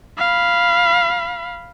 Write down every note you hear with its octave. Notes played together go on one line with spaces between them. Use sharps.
F5 B5